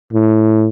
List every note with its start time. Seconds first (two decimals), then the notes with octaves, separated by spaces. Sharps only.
0.13 A2